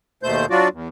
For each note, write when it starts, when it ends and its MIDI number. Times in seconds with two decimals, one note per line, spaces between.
0.23 0.46 39
0.23 0.46 47
0.23 0.46 57
0.23 0.46 72
0.23 0.46 91
0.50 0.68 54
0.50 0.68 62
0.50 0.68 65
0.50 0.68 66
0.50 0.68 74
0.72 0.88 40